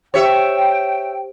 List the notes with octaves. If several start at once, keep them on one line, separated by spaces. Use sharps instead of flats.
G4 C5 C#5 E5 G5